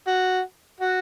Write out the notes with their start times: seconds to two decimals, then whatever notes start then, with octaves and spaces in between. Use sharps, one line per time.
0.07 F#4
0.80 F#4